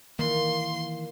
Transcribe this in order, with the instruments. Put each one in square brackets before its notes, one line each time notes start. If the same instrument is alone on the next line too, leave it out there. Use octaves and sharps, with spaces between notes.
[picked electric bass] D#3 E3 [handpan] A#3 [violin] C6